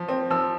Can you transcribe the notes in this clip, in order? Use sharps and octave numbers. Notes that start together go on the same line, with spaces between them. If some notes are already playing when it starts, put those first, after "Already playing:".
Already playing: F3
C4
F3 E6